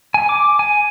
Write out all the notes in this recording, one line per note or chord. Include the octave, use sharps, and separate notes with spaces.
G#5
D6
G#5